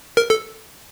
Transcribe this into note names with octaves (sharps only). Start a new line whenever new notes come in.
A#4
A4